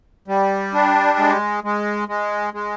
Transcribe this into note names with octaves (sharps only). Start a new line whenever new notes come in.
G3
D4
G#3
G#3
G#3
G#3